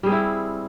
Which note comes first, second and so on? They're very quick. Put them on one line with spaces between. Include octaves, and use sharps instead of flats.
G3 G#4 C4 E4